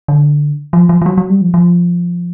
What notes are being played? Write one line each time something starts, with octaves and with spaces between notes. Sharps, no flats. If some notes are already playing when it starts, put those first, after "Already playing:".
D3
F3
F3
F3
F#3
F#3
G3
F3
F3